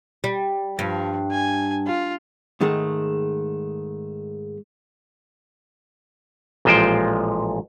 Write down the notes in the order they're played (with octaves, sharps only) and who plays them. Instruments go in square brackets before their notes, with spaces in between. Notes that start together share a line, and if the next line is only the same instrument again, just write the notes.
[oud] G3
[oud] G2 [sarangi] F3
[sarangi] G#5
F4
[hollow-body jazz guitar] G#2 D#3 G#3 A3
[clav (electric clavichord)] A1 A#2 F3 G#3 C5 G5